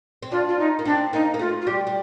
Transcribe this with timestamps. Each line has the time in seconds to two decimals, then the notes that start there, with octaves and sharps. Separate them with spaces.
0.23 C4
0.31 D4 F4
0.48 F4
0.58 D#4
0.79 A#3
0.85 C4 D4
1.13 A#3 D#4
1.34 A#3
1.39 A3 F4
1.61 F4
1.67 G3 G4
1.87 G3